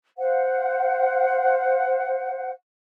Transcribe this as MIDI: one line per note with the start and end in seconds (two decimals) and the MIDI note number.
0.18 2.51 72
0.18 2.51 77
0.18 2.51 78